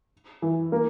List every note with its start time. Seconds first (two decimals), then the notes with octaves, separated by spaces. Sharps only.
0.42 E3
0.72 A#3